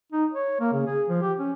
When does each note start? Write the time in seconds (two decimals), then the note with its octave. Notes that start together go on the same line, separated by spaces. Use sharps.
0.12 D#4
0.32 C#5
0.60 A#3
0.73 C#3
0.87 G#4
1.08 F3
1.22 G4
1.38 C#4